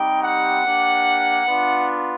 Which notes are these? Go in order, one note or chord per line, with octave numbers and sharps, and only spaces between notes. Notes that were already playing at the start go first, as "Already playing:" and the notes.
Already playing: G3 C4 D#4 G4 G5
F#5
A#3 D4 G4
B3 D4 F4